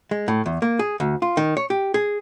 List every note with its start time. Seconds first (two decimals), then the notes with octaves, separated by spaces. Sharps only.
0.11 G#3
0.28 A2
0.46 E2
0.62 A#3
0.79 G#4
1.00 D2
1.22 F4
1.37 D#3
1.57 C#5
1.70 G4
1.94 G#4